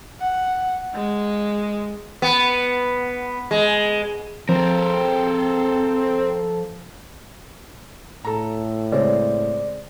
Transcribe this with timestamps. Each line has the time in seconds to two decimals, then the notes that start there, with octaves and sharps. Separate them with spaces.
0.21 F#5
0.95 G#3
2.22 B3
3.51 G#3
4.49 F3 C4 A4 A#4
8.25 A2 A4 A#5
8.92 C#3 G#3 C4 C#5 D5